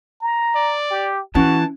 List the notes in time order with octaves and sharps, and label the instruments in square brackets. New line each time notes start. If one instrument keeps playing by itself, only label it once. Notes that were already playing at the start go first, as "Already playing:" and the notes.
[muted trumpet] A#5
[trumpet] D5
[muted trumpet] G4
[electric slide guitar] E3 [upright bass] C#4 [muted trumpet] F#4 [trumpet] A5